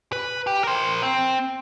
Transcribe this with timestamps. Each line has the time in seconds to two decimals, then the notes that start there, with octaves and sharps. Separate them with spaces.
0.12 B4
0.47 G4
0.64 A#4 C5
1.03 C4